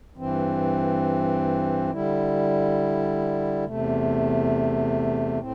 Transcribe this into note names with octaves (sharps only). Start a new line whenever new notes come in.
G2 E3 C4
D3 G3 E4
E2 C3 A3
A2 C4